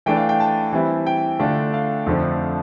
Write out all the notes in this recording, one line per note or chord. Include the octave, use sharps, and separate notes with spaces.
E3 A3 D4 G5
F5
G5
A5
E3 G3 C4 E4
G5
D3 A3 D4 F4
F5
F2 D3 F3 A3 D4